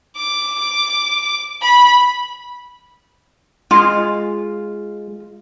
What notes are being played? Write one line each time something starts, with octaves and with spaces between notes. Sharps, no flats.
D6
B5
G#3 F4